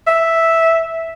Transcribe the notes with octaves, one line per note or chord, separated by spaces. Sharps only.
E5